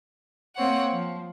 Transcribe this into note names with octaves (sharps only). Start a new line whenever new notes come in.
A#3 C4 C#5 F#5
F3